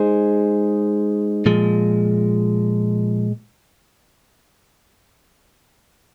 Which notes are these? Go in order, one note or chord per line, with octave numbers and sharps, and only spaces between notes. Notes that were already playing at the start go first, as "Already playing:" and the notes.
Already playing: G#3 D#4 G#4 C5
A#2 F3 G#3